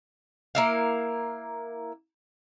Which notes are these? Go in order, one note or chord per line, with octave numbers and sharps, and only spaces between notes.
A#3 E4 F5